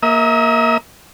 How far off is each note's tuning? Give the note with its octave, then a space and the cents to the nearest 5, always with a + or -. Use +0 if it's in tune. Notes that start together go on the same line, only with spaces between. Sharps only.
A#3 +0 E5 -35 D#6 +35